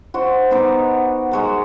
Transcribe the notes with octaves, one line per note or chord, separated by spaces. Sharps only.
F#4 C5 D#5
B3 D#4 D6
G#3 F#4 A#4